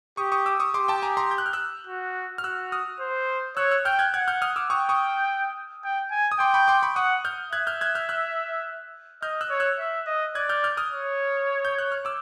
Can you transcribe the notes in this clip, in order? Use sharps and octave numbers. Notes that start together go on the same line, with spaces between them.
G4 C#6 D#6
C#6 D#6
D6 E6
C#6 D#6
G4 C6 D6
G5 A5
G#5 A#5
A#5 C6
G6
F#6
F6
E6 F#6
F#4
F6
F#4 E6 F#6
D#6 F6
C5
C#5 E6 F#6
E6 F#6
G5 F6 G6
F#6 G#6
F#5 F#6 G#6
F6 G6
D#6 F6
D6 E6
G5 C#6 D#6
C#6 D#6
G5
G#5
D#6
G5 C6 D6
B5 C#6
C6 D6
B5 C#6
F#5 C#6 D#6
F6 G6
E5 F#6 G#6
F6 G6
F#6 G#6
F6 G6
E6 F#6
D#5 F6 G6
E6 F#6
C#5
E6 F#6
E5
D#5
D5 F#6 G#6
F6 G6
F6 G6
D#6 F6
C#5
G6
F#6
F6
D6 E6